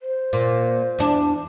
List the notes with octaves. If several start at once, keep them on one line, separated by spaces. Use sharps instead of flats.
C5
A#2
E2 D4